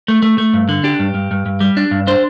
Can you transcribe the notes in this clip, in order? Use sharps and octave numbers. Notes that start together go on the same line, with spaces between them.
A3
A3
A3
G2
D3
D4 G4
G2
G2
G2
G2
G3
D4
G2
D4 C5